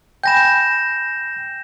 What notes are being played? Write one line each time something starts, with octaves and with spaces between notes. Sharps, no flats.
G5 G#5 B5 G6 A#6 E7